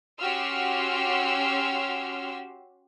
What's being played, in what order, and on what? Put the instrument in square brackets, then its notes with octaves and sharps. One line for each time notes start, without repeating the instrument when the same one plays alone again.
[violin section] C#4 F#4 G4 C6 E6 F6